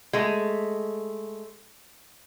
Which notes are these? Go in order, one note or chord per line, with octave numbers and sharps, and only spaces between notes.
G#3 A3